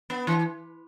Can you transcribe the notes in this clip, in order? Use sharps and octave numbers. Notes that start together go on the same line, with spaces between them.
B3
E3